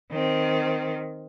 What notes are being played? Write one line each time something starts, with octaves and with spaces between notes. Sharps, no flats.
D#3 C4